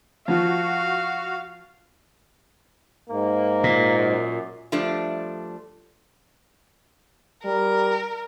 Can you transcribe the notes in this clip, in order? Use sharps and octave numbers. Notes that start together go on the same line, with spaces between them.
F3 F#4 F5
G#2 A#3
A#2
F#2
F3 G3 A3 D4
G3 A#4